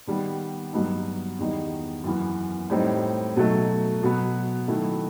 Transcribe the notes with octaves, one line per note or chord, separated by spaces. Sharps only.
D#3 G3 B3
G2 F#3 B3 D#4
E2 D#3 G3 B3 D#4
F#2 E3 B3
A2 G3 C4 D#4
B2 F#3 A3 D#4
B2 F#3 B3
D#3 F#3 A3 E4